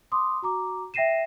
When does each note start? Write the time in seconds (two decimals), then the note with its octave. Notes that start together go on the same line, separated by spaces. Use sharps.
0.12 C6 D6 D#6
0.42 F#4 A#5 D6
0.94 E5 G5 A#6 C7 D#7 E7